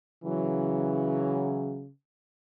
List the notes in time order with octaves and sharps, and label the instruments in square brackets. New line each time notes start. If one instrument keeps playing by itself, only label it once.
[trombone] C#3 [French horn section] E3 F#3